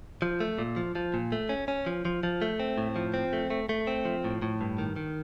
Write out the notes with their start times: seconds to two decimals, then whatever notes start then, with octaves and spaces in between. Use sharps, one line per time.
0.22 F3
0.40 A3
0.59 A#2
0.76 F3
0.95 F3
1.14 A#2
1.32 A3
1.49 C#4
1.68 C#4
1.86 F3
2.05 F3
2.23 F3
2.42 A3
2.60 C4
2.78 A2
2.96 F3
3.14 C4
3.33 A3
3.50 A3
3.69 A3
3.87 C4
4.05 F3
4.24 A2
4.42 A2
4.61 G2
4.78 D#3
4.96 D#3